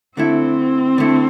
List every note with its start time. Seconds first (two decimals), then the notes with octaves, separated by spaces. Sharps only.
0.17 D3 A3 C4 E4
0.98 D3 A3 E4